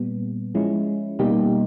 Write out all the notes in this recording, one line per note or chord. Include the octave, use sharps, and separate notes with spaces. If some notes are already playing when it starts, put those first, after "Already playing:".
Already playing: A#2 G3 B3
F3 G#3 C#4 E4
B2 G3 A#3 D#4 G4